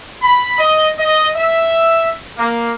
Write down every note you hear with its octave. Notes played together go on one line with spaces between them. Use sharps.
B5
D#5
D#5
E5
A#3